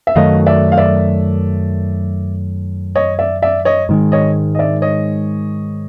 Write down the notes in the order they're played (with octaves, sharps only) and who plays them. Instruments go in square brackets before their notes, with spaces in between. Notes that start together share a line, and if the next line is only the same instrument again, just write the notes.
[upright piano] E5
[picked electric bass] F#2 D#3 F#3 A3 [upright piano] D#5 F5
[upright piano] D5 E5
F5
D5 E5
C#5 D#5
D5 E5
D5 E5
C#5 D#5
[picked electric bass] G#2 D#3 G#3
[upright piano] C#5 D#5
D#5
D5 E5
C#5 D#5